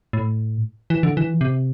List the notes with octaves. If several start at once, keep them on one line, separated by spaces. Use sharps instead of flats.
A2
E3
D3
E3
C3